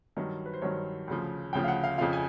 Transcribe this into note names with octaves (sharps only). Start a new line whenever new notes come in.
G2 D#3 F#3
B4
C5
G2 D#3 F#3 C#5
D2 C#3 F3
D2 C#3 F3 G5
F5
F#5
F5
F2 C#3 F3 F5
G#5